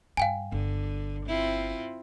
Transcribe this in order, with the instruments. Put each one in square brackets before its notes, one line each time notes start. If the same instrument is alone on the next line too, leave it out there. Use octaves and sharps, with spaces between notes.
[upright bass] G2 [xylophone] F5 G5 G#5
[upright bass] G1 [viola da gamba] D3
[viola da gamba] C4 E4 F4